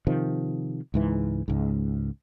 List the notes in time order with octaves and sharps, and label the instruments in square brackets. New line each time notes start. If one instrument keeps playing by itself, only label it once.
[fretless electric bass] C3 D#3 F3
C#2 G#2 E3
C#2 G#2